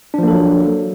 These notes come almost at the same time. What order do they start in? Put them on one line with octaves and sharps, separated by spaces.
D4 F3 A#3 A4 F#3